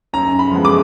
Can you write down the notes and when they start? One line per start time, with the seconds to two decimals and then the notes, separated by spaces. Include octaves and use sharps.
0.13 F#2 A#5
0.39 B5
0.51 F3 G#3 B3
0.65 D6